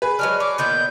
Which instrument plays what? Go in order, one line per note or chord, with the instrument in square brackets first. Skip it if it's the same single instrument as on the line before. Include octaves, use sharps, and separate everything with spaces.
[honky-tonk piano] G#4 B4
[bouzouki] F#3 G#3 D4 [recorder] F6
[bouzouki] C#5 [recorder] D6
[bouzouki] A#2 D#3 B3 [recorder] G6